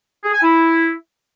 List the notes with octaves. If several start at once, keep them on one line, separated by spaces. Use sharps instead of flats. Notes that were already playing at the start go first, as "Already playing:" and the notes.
G#4
G#5
E4